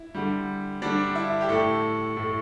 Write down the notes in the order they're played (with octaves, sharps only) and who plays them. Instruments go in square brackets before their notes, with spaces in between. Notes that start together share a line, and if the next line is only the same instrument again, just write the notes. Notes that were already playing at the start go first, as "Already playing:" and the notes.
Already playing: [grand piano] E4
D3 G3
D3 G3 D4
E4
G4
A2 A3 A4
A2 A3